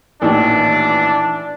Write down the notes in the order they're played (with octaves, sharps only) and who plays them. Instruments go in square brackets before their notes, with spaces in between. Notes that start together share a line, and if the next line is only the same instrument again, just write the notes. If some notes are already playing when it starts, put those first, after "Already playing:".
[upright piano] A1 A#2 D#3 [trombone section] E3 D4